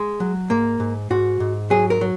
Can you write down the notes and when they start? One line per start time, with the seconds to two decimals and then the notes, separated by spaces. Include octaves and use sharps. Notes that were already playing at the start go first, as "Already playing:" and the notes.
Already playing: G#3
0.20 F#3
0.50 G#2 A#3
0.80 G#2
1.10 G#2 F#4
1.40 G#2
1.70 F#3 G#4
1.90 A#4
2.01 F#3